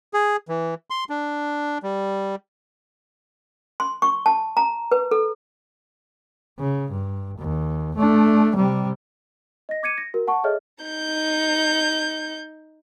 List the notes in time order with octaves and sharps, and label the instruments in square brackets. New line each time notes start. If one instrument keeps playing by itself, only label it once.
[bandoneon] G#4
E3
C6
D4
G3
[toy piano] C6
C#6
A5
A#5
B4
A4
[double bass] C#3
G2
D#2
A3 D4
C3 G3
[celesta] D#5 A#6
D6 G#6 C#7 D#7
A#6
F#4 A#4
F#5 A5 C#6
G#4 A4 C#5 D#5 E5 F6
[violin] D#4 G6